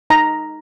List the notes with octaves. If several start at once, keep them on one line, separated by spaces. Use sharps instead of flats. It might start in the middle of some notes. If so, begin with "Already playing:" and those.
D#4 A#5